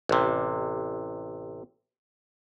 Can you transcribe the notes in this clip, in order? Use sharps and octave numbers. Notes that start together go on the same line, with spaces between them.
A1 C3